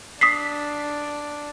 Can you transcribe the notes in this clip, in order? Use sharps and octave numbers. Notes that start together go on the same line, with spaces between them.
D4 D#6 B6 C7